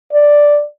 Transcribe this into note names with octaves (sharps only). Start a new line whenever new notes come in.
D5